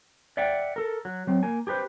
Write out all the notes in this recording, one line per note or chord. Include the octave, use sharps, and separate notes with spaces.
D5 E5 F#5 G5
A4 A#4
F#3
F#3 C4
A#3 G#5
G4 G#4 B4 C5